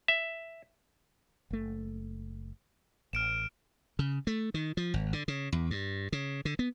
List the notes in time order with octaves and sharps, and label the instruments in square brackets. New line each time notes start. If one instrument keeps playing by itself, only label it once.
[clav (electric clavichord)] E5
[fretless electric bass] F#1 A3
[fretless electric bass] A1 [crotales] F6 D7 E7
[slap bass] C#3
A3
D#3
F3
G#1
D3
C#3
E2
G2
C#3
D3
B3